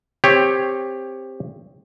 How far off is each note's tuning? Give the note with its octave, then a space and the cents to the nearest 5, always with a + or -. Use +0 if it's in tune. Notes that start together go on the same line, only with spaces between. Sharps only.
C4 +0 G4 +15 C#5 +0